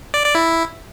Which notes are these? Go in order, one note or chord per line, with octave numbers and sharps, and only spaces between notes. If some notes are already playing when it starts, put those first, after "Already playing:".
D5
D5
E4